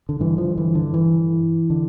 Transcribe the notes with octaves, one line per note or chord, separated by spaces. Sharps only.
D3
G2 D3 E3
F3
E3
D3
E3
D3